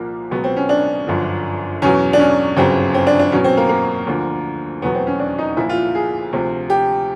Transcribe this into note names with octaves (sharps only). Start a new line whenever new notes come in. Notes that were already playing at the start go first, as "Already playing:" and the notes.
Already playing: C2 A#2 F3 A#3
C#2 B2 F#3 B3
C4
C#4
D4
G1 F#2 D3 F3
E2 B2 F#3 C#4
D4
C#4
G1 F#2 C#3 F#3 C4
C4
D4
D4
E2 B2 F#3 C#4
C4
A#3
A#3
D2 D3 F3
F1 E2 B2 F#3 B3
C4
C#4
D4
D#4
C2 A#2 F3 E4
F4
G#4
D2 C3 F3
G4